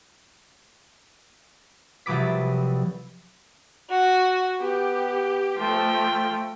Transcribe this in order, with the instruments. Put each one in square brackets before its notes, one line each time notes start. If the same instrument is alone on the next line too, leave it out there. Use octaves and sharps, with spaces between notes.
[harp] C2 F3 F#3 B4 D6 B6
[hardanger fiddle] F#4
[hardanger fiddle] B3 [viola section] G4
[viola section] F3 A3 [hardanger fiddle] G5